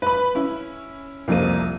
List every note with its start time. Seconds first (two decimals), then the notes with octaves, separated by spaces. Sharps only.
0.02 B4 B5
0.35 C#4 E4
1.28 C2 F2 A#3 C4 D#7